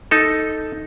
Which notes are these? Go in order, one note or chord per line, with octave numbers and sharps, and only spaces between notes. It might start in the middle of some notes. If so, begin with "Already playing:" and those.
D#4 A4